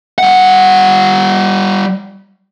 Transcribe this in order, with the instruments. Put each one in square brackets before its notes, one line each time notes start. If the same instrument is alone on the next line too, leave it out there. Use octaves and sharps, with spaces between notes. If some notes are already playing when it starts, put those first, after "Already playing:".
[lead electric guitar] G3 F#5